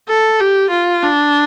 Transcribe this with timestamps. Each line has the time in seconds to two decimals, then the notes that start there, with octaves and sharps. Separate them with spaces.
0.09 A4
0.40 G4
0.70 F4
1.02 D4